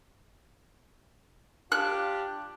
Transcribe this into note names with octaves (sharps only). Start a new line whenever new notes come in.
D4 F4 G4 F#6